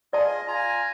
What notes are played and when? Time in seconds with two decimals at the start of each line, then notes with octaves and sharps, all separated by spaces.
0.13 F4 G#4 D5 D#5 A5
0.48 F4 G#5 A#5